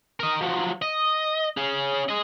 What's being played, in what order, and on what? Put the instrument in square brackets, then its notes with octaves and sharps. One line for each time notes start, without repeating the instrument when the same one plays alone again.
[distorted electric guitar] A#4 D#5
F3 F#3
D#5
C#4 G#4
G#4 D#5